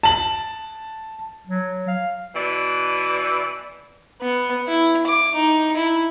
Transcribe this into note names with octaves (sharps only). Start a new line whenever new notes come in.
A5 F#7
F#3
F5
B2 E3 D5
B3
E4
D6
D#4
E4